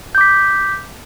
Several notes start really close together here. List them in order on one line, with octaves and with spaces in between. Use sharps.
G6 D6 B6